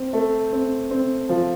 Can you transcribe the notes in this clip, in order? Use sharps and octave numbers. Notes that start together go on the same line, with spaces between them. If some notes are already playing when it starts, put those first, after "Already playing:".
Already playing: C4
A3
C4
C4
F3